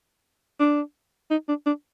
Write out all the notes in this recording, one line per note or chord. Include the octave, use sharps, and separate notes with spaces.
D4
D#4
D4
D4